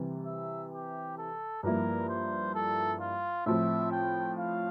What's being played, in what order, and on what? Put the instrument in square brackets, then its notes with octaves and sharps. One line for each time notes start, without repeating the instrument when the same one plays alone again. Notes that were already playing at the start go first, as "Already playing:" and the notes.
Already playing: [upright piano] C3 E3 G3
[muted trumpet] E5
G4
A4
[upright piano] G2 F3 A#3 E4 [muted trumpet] A#4
[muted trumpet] C5
A4
F4
[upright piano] A2 F3 C4 [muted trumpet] E5
[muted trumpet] G5
F5